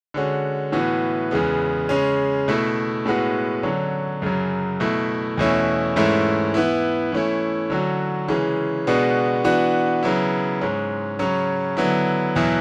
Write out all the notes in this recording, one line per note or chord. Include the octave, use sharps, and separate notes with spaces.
D3 G#3 C#4 F#4
A2 E3 B3 F#4
E2 C#3 G#3 B3
C#3 G#3 C#4
B2 A3 E4
A2 G#3 B3 F#4
D3 F#3 C#4
F#2 C#3 F#3
B2 A3 E4
E2 B2 A3 C#4 E4
G#2 E3 A3 C#4 E4
E3 B3 E4
E3 A3 C#4 E4
D3 F#3 C#4 F#4
C#3 E3 G#3 C#4
B2 G#3 B3 D4 F#4
E3 B3 D4 F#4
C#3 F#3 B3 E4
G#2 G#3 C#4
C#3 F#3 C#4
D3 F#3 B3 E4
E2 B2 F#3 B3 E4